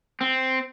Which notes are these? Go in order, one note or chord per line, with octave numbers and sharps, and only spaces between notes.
C4